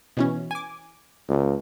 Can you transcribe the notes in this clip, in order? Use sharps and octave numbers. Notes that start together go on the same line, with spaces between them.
B2 E3 C#4
G#5 D6
C#2